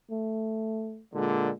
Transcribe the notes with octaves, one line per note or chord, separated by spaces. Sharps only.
A3
A#2 D3 G#3